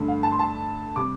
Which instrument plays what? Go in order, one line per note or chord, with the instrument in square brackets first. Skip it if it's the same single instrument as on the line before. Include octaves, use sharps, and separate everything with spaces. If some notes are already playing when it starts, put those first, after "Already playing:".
Already playing: [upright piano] G2 D3 A3
F5
A5
C6
A5
C3 G3 D6